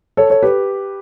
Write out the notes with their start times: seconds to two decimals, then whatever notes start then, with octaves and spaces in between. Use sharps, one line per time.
0.17 A4 C#5
0.30 A4 C#5
0.43 G4 B4